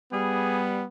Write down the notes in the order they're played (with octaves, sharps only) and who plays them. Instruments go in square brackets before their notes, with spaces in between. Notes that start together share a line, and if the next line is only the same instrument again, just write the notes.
[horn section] G3 [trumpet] B3 [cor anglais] G#4